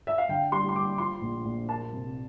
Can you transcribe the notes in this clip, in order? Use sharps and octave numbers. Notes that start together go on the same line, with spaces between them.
E5
F5
D3 G5
G3 C6
C6
G3 D6
F3 C6
A#1
A#1
A#3 A5
C3